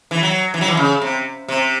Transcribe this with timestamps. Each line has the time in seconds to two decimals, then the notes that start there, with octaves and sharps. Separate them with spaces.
0.11 E3
0.23 F#3
0.54 E3
0.61 F#3
0.68 E3
0.77 C#3
1.02 C3
1.48 C3